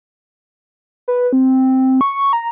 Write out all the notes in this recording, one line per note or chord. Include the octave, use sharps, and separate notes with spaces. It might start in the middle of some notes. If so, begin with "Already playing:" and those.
B4
C4
C#6
A#5